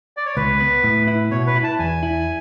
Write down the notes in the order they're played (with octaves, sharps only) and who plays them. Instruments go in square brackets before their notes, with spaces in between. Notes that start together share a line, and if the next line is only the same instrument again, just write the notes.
[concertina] D5
C#5
[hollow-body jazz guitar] C#2 [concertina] B4
[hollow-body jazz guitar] B3
A2
E4
[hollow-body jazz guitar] B2 [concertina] C#5
[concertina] B4
[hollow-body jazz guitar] E4
[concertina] A5
[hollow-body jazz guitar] E2 [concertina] G#5
[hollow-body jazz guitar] E4